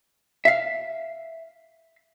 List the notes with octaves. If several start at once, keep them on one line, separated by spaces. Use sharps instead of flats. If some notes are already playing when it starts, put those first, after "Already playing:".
E5 F5